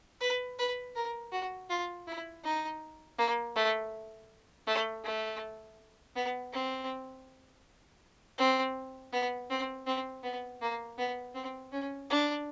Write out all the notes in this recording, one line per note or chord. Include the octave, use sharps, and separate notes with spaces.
B4
B4
A#4
F#4
F4
E4
D#4
A#3
A3
A3
A3
B3
C4
C4
B3
C4
C4
B3
A#3
B3
C4
C#4
D4